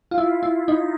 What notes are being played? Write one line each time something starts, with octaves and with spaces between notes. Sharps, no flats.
F4
E4
E4
D#4